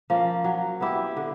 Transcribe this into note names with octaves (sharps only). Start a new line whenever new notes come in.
F3 A#3 C#4
F#3
B3 E4 G4
D3